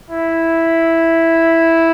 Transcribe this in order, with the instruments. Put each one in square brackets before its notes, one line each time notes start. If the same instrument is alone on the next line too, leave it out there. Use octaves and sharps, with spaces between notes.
[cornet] E4